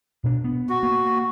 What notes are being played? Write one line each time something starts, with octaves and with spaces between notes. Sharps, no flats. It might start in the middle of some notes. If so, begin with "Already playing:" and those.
B2 D4
B3
F#4
A#3